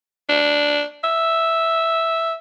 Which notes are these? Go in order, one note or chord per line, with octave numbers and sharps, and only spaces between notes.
D4
E5